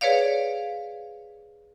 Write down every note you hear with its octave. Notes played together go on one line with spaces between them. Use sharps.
G#4 B4 C#5 D5 F5